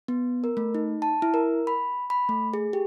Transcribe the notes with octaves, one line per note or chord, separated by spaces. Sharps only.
B3
A#4
A3
D#4
A5
E4
A#4
B5
B5
A3
G#4
G4